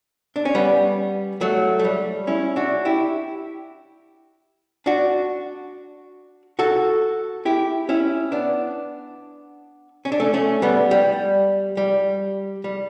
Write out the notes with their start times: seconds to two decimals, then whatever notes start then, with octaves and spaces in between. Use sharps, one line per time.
0.36 D4
0.45 C#4
0.55 G3 B3
1.41 F#3 A3
1.79 A3
1.84 G3
2.27 C#4 E4
2.56 D4 F#4
2.85 E4 G4
4.86 D4 F#4
6.59 F#4 A4
7.45 E4 G4
7.89 C#4 E4
8.32 B3 D4
10.05 C#4
10.12 D4
10.20 A3 C#4
10.34 A3 C#4
10.62 G3 B3
10.91 G3
11.77 G3
12.64 G3